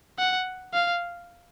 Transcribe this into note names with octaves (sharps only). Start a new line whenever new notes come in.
F#5
F5